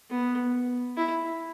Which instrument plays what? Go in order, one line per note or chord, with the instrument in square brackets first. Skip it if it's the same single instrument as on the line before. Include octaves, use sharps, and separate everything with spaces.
[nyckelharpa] B3
E4